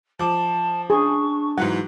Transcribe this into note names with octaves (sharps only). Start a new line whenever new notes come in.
F3 A5 D6
D4 G#4 C#6
G#2 E3 F#3 F#5